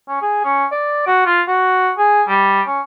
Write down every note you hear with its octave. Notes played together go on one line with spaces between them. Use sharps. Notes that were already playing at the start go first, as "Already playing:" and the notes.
C#4
G#4
C#4
D5
F#4
F4
F#4
G#4
G3
C#4